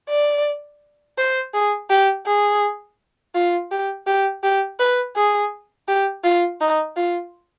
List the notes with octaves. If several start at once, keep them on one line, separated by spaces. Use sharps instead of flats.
D5
C5
G#4
G4
G#4
F4
G4
G4
G4
B4
G#4
G4
F4
D#4
F4